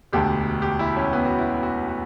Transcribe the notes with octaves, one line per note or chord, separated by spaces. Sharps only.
E1 D2 D3 G4
G4
E4
C#4
B3
F#4
E4
F#4
F#4